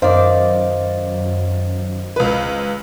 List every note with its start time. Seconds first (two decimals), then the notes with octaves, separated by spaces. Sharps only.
0.02 F#2 D#3 C5 D5 F5
2.16 C#2 B4